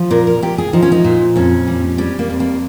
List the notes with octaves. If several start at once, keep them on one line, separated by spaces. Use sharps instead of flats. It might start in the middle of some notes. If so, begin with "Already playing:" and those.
Already playing: F3
A#2 A#4
A#4
A#2 G4
G#4
F3 D#4
C#4
D#4
A#2
F2 C#4
G3
G3 C#4
A#3
F2
A#3